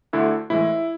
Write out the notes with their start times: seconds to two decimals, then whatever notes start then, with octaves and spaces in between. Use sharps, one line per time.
0.13 D2 D3 A3 E4
0.50 A2 E3 G#3 E4